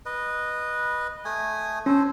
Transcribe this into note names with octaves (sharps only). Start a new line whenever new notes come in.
B4 D#5
A3 G#5 D#6
C#4 A4 C5